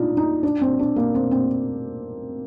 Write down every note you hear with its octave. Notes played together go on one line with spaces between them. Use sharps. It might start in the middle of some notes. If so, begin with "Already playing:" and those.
Already playing: D4 D#4 F4
D#4
D4
C4
D4
A#3
C4
C4